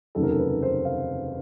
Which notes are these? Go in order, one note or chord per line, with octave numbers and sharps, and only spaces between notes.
F1 D#2 C#3 F#3 A4
A#4
A4
B4
C5
F5